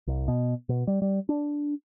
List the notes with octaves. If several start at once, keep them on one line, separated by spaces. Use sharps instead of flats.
C2
B2
B2
G3
G3
D4